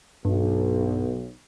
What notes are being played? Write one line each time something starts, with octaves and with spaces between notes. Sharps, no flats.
B1 G2